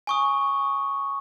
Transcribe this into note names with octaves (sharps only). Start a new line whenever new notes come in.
G#5 C#6 D#6